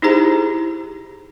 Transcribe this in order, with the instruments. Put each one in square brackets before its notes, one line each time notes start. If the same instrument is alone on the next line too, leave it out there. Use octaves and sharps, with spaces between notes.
[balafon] D#4 E4 G4 G#4 C5 A#5